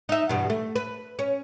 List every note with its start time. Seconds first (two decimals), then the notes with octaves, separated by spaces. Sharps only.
0.09 D#4 E5
0.29 E2 G2 B2
0.50 A3
0.76 B4
1.19 C#4